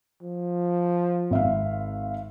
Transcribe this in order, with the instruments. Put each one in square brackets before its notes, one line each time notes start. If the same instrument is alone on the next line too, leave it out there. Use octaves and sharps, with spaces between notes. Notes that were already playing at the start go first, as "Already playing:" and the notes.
[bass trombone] F3
[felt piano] G#1 E5 F5